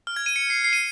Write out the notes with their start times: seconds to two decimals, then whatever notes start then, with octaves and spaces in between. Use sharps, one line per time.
0.07 F6
0.16 G#6
0.26 D#7
0.36 C#7
0.50 C7
0.64 C7
0.73 D#7